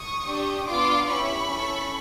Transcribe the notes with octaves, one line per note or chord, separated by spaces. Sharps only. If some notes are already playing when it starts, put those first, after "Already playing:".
Already playing: C#6 D#6
D4 G4
B3 D4 F4 C6 D6
C#4 E4 G4 B5 C#6
C#4 E4 A4